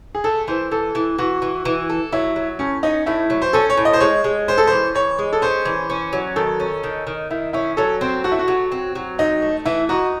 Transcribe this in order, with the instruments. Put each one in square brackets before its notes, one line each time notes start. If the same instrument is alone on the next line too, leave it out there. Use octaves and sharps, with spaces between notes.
[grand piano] G#4
[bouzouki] A3 [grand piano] A4
[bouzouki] E3 [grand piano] C5
[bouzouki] E3 [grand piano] A4
[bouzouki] E3
[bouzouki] E3 [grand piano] F#4
[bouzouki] E3
E3
A4
[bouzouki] F#3 [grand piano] E4
[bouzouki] F#3
[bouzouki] A2 [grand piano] C#4
[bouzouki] C#4 [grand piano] D#4
[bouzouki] A2 [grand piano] E4
[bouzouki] F#3
[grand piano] C5
[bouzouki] C#4 [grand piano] A4
[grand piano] C#5
[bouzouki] A2
[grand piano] D#5
C5
[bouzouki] G#3 [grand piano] C#5
[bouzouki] G#3
[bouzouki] C#4 [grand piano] C5
[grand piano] A4
[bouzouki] E3 [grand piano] C5
[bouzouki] E3 [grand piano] C#5
[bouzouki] G#3
[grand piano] A4
[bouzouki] C#4 [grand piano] C5
[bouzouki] E3
C#4
F#3
[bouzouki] D#3 [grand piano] A4
[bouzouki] C#4
D#3
D#3
[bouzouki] D#3 [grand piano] E4
[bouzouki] C#4 [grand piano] E4
[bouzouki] F#3 [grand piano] A4
[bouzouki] C4 [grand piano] C5
[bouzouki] A3 [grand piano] F#4
[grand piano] E4
F#4
[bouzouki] F#3
C4
F#3
[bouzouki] C4 [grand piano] D#4
[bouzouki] A3
[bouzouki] E3 [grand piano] E4
[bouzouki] D#4 [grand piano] F#4